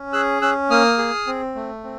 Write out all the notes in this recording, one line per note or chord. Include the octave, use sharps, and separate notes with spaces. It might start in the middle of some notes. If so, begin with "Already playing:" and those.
Already playing: C#4
G#4 E6 F#6
C#4 E6 F#6
A#3 D#6 F6
G#4
C4
A3
C4